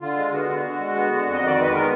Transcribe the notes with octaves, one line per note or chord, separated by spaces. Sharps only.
D3 F4
G#3
B3 F#4
D3
D3
G#3
B3
D3
F2
D#5
D#3 D5
G#3 B4
B3 A#4